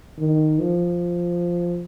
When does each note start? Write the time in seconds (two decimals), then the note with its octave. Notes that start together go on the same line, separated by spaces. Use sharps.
0.19 D#3
0.59 F3